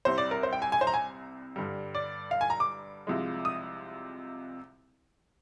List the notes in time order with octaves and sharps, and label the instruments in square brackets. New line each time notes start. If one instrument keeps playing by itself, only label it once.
[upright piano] C2 C3 G3 C5
D5
A#4
C5
G5
G#5
G#5
C5
A#5
G#5
G2 D3 G3
D5
F5
G#5
A#5
D6
C2 C3 F3 G#3
D#6